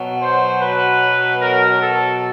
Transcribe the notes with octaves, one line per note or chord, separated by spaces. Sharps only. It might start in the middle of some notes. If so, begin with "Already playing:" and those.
Already playing: B2 F#3
C5
B4
A#4
A4